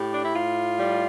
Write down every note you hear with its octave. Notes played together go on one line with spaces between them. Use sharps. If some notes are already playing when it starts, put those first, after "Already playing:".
Already playing: A2 G4
D4
E4
A2 F4
G3